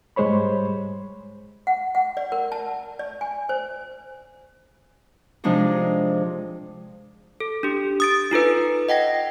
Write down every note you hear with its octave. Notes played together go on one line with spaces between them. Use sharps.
G#2 G3 G#3 C5 C#5 B5
F#5
F#5
D5
A#4
A5
D5
G#5
C5
C3 F3 G#3 D4 D#4 G#4
A4
D4 G4
D#6 A6 D7
D#4 F4 A4 B4
D#5 F#5 G5 A#6